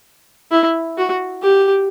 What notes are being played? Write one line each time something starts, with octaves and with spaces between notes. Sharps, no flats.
E4
F#4
G4